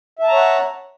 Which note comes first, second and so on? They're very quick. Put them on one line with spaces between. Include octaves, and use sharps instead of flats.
E5 A5 A#5 C#5 F#5